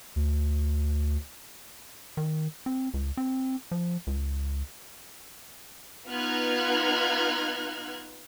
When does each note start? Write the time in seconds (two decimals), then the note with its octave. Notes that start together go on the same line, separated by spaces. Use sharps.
0.16 D2
2.17 D#3
2.66 C4
2.94 C#2
3.17 C4
3.71 F3
4.07 C#2
6.08 B3 D#4 F4 F6 F#6 G#6